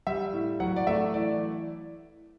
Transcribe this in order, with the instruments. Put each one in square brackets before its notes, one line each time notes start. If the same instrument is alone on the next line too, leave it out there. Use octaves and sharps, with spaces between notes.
[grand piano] G3 E5
A2
F#3 F#5
D5
A3 E5
E3 D5